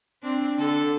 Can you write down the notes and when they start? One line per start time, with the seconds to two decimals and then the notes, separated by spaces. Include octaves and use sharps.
0.23 C4 D4
0.59 D3 A4